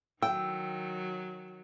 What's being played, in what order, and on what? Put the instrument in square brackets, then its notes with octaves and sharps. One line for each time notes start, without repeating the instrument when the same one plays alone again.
[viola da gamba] D#3 F#3 [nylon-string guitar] G5 [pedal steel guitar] E6